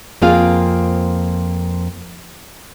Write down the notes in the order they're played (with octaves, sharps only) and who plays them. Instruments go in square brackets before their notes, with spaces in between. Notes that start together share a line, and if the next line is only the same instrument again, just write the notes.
[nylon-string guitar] F2 A#3 C4 F4 G#4 F5